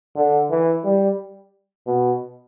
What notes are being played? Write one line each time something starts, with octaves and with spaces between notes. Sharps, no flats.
D3
E3
G3
B2